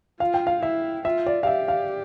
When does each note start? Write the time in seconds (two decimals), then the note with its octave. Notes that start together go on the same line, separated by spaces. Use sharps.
0.20 F4 F5
0.34 G5
0.47 F5
0.63 E4 E5
1.05 F4 E5
1.26 D5
1.43 F5
1.47 G4 E5
1.68 F5